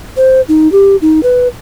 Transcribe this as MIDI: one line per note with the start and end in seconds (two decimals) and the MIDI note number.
0.17 0.41 72
0.49 0.71 63
0.72 0.96 67
1.02 1.20 63
1.23 1.48 71